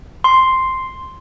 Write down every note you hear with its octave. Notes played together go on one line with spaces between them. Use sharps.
C6